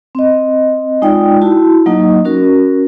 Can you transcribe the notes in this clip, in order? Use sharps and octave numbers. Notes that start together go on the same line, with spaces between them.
C4 D#5
G#3 D#4 F4 D5 G5
E4 F#4 A5
F#3 A#3 D#4 D#5
C#4 F#4 A#4